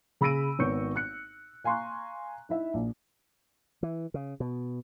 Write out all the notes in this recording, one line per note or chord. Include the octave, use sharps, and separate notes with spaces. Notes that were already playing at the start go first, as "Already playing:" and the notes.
C#3 B5 E6 A#6 D7 D#7
G#1 B3 C#5 C#6 G6 C#7
F#6 C#7
F5 G#5 A#5 C6 C#6 F#6
D#4 E4 E5
A#1
E3
C#3
B2